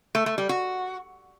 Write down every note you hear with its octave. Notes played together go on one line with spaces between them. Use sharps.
A3
A3
G3
F#4